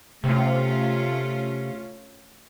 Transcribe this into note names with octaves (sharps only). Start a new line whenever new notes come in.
C3 A3 C#4 F4